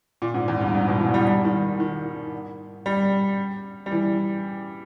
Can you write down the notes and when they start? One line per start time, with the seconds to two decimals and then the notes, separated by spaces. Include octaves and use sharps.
0.22 A#2
0.34 G#2
0.48 E2
0.61 G2
0.74 G#2
0.88 B2
1.00 E3
1.14 G3
1.27 G3
1.45 D#3
1.80 D#3
2.86 G3
3.86 G3
3.91 E3